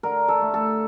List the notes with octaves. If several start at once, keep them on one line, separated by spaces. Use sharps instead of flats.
D3 A#4
A4
A3
A4